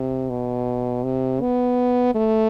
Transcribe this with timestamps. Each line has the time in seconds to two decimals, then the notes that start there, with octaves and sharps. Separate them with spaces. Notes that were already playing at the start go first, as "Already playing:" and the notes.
Already playing: C3
0.30 B2
1.04 C3
1.41 B3
2.15 A3